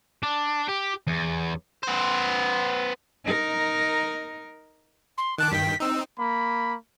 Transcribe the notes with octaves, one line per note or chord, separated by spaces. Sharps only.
D4
G4
E2
B3 C5
D#4 A#4
C6
D#3 A5 D6 F#6
G2 D#3 G5 B6
C4 D#4 E6
A#3 B5